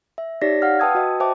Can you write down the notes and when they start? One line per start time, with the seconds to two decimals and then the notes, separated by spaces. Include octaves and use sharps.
0.18 E5
0.41 D#4 G4 C#5 D5 A#6 B6
0.62 F5 F#5 F6
0.80 B4 G5 A5 D#6 E6 G#6
0.95 F#4 D#5
1.20 C5 E5 G5 A5 D6